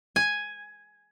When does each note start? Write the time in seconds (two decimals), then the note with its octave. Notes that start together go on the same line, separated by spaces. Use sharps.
0.16 G#5